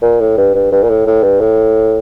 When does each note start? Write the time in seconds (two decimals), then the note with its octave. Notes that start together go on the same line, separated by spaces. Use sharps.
0.02 A#2
0.20 A2
0.37 G2
0.54 G2
0.72 G2
0.83 A#2
0.89 A2
1.07 A2
1.23 G2
1.40 A2